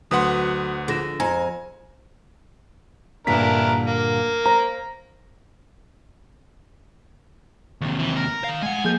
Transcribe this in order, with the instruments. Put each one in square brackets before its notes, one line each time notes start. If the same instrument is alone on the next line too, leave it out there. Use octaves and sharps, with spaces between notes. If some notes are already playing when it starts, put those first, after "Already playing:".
[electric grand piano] D2 B4 F#5 [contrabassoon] F#3 [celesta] C6 D#6
[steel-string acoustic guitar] D3 [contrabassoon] F3 [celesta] G#4 A#6 E7
[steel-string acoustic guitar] F2 [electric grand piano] G#5 A#5
[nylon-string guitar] G2 A#2 D3 [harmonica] D4 E4 A#4 [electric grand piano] B6
[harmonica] A#3
[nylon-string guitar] C5 [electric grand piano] A#5
[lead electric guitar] D#2 C3
[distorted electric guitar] E3
A#4
[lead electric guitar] D#3 F5
[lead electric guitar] G#3 F#5 [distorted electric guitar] G#5
[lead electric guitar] F3 [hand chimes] A#3 G#4 G6